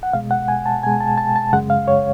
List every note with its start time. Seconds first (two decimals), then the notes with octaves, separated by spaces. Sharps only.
0.03 F#5
0.13 B2 G#3 F5
0.31 F#5
0.48 G#5
0.66 A5
0.83 B2 G#5
0.87 G#3
1.00 A5
1.18 A5
1.36 A5
1.53 F#2 C#3 G#3 F#5
1.70 F5
1.88 C#5